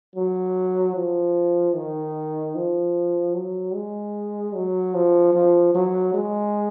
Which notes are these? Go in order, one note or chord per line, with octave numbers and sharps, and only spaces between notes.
F#3
F3
D#3
F3
F#3
G#3
F#3
F3
F3
F#3
G#3